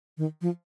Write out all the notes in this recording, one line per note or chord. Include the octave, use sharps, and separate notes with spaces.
D#3
F3